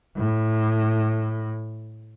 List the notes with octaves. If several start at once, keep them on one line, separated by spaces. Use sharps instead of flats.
A2